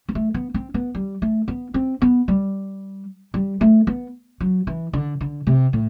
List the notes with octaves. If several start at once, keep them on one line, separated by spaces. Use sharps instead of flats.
B3
A3
B3
C4
B3
G3
A3
B3
C4
B3
G3
G3
A3
B3
F#3
E3
D3
D3
C3
A2